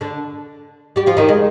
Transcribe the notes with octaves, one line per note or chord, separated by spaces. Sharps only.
D3 D4
G3 G4
F3 F4
D#3 D#4
G#3